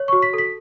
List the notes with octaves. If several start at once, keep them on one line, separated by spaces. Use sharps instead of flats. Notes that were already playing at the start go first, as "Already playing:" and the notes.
Already playing: C#5
C#6
F#4
B6
A4 B6